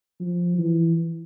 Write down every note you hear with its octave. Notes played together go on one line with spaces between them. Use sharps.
F3
E3